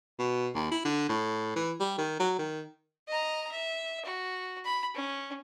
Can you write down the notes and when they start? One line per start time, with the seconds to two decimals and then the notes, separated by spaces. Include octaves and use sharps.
0.19 B2
0.54 D#2
0.72 E4
0.85 D3
1.09 A2
1.56 E3
1.80 G3
1.98 D#3
2.20 F#3
2.39 D#3
3.08 D#5 A#5
3.51 E5
4.05 F#4
4.64 B5
4.94 C#4